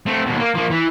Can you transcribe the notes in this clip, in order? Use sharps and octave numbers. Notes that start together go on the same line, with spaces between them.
A3 C4
D#2 B2
A#3
F3 A#3
E3